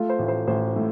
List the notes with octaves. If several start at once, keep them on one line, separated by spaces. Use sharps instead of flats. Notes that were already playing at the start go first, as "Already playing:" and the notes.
Already playing: A3 F4
C5
A1
C5
A1 C5
A2